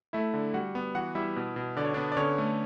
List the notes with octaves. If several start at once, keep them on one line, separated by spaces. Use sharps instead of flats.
A3 E4 E5
D3
G3 F#4 F#5
B3
E3 F#4 F#5
G3 E4 E5
B2
B2
D3 D5
C#5
B3 D4 D5
D5
D3 C#4 C#5
A3